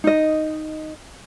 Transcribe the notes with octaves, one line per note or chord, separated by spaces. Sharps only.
D#4 D#5